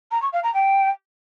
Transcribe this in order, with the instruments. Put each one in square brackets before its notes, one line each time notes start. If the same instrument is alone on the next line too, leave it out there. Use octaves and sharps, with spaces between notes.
[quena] A#5
C#6
F5
A#5
G5